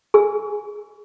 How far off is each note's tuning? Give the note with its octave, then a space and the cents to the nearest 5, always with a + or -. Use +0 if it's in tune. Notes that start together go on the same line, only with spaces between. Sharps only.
G#4 +0 G#5 +0